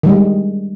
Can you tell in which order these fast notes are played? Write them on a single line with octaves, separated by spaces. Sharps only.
D#3 G3 G#3